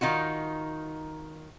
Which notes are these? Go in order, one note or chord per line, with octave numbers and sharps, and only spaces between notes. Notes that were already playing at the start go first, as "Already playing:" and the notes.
D#3 D#4 F4 F#4